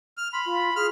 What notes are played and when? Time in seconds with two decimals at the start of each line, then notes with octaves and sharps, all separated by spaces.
0.17 F6
0.33 B5 C6
0.46 F4
0.76 G#4 F6